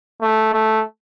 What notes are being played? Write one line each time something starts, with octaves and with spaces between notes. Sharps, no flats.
A3
A3